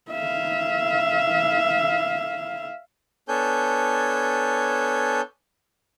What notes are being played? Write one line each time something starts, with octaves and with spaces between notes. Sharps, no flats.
E5 F5
B3 D4 A4 C#5 G#5 G6